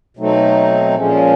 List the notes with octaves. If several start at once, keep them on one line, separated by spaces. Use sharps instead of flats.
B2 F#3 A3 C4 D#4
A#2 F3 G#3 C#4